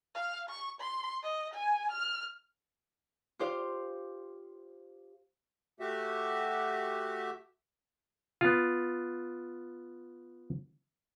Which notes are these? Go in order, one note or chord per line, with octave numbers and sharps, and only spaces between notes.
F5
C#6
C6
D#5
G#5
F6
F4 G4 C5 F5
A3 F#4 G4 E5
B3 F4